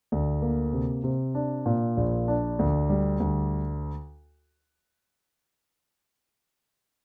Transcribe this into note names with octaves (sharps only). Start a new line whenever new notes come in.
D2
A#3
C3
C3
D4
A#2
A#1
D4
D2
G3
D2